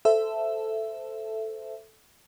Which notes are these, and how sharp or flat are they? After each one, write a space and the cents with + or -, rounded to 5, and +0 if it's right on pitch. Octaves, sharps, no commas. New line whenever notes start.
A4 +0 C5 -15 E5 +10